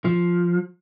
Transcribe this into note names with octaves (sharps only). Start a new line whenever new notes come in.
F3